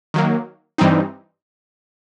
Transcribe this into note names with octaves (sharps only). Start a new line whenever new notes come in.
D#3 F#3 A#3
G2 E3 G3 C4 D#4